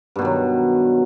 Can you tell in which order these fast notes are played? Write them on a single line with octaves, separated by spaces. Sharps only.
G2 B2 D#3 F#3